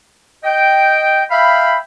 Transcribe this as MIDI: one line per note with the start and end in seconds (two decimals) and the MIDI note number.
0.44 1.24 75
0.44 1.24 79
1.30 1.76 76
1.30 1.76 77
1.30 1.76 79
1.30 1.76 83